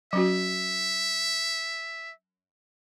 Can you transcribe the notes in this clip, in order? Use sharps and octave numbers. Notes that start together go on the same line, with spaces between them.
F#3 C#4 F#4 E5